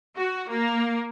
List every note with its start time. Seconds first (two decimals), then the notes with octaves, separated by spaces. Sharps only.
0.16 F#4
0.48 A#3